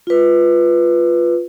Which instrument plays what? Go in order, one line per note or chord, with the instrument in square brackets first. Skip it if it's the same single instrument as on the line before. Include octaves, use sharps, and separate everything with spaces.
[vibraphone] F4 B4